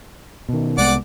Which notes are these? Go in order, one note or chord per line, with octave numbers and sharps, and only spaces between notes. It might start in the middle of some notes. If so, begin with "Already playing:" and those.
B2 D#3
C2 G#3 B3 D5 F#5 D6